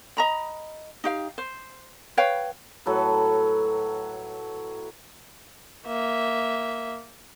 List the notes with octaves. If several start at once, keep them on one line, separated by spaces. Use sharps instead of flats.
D#5 A#5 B5
D#4 G4 F5
C5
B4 C#5 F5 G5
A2 F#3 A4 B4
A#3 E5